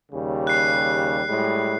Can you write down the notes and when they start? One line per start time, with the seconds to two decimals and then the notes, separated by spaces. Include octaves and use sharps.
0.12 D#2 C#3 G3
0.47 F#6 C7
1.28 A2 G3 G#3